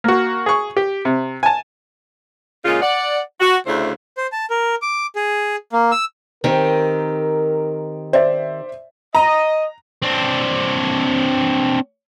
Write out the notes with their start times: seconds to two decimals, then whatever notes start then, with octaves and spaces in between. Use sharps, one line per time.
0.04 A#3 F#4
0.46 G#4 C#6
0.77 G4
1.05 C3
1.43 G#5 A5
2.64 A#2 C#3 G#3 C#4 F4
2.82 D5 F#5
3.40 F#4
3.66 D2 C#3 A3 D4 E4 C5
4.17 C5
4.32 A5
4.50 A#4
4.82 D6
5.16 G#4
5.73 A#3
5.92 E6
6.44 D#3 C4 G4 A#4
8.13 C5 D5 E5
9.15 D#5 A#5
10.02 C4 D4